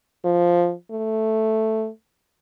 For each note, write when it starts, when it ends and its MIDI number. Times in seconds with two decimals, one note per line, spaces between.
0.25 0.73 53
0.91 1.88 57